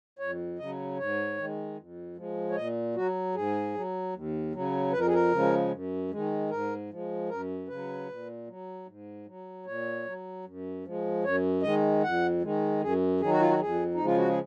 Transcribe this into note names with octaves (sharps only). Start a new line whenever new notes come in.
F2 C#5
C#3 F#3 D#5
G#2 C#5
D#3 G#3
F2
F3 G#3
C#5
A#2 D#5
F#3 F#4
G#2 G#4
F#3
D#2
C#3 F#3
F2 B4
A#4
G#4
A#4
C#3 F3 G#3
F#2
D#3 G#3
G#2 A#4
F3 G#3
F#2 A#4
C#3 F#3 B4
A#2
F#3
G#2
F#3
A#2 C#5
F#3
F#2
F3 G#3
F#2 C#5
D#3 G#3 D#5
F2 F#5
D#3 G#3
F#2 G#4
D#3 F#3 G#4
F#4
F4
F#4
F2 G#4
D#4
C#3 F3 G#3
F4
F#4
G#4